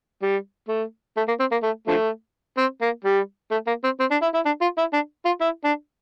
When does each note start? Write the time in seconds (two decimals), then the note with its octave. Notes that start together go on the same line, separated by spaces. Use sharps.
0.22 G3
0.69 A3
1.17 A3
1.28 A#3
1.40 C4
1.52 A#3
1.63 A3
1.88 D3 F3 A3
2.58 C4
2.82 A#3
3.05 G3
3.51 A3
3.67 A#3
3.84 C4
4.00 C4
4.11 D4
4.22 E4
4.34 E4
4.46 D4
4.62 F4
4.78 E4
4.93 D4
5.25 F4
5.41 E4
5.64 D4